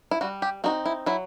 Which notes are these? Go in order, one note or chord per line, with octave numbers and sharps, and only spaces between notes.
E4
G3 F#4
G4
C4 D#4 F#4
E4
F#3 E4